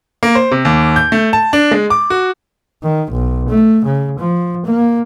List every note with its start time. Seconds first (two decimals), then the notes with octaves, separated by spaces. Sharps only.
0.23 A#3
0.35 C5
0.52 C3
0.65 D#2
0.96 G6
1.12 A3
1.33 A5
1.53 D4
1.71 G#3
1.90 D6
2.10 F#4
2.83 D#3
3.12 B1
3.49 A3
3.85 C#3
4.19 F3
4.66 A#3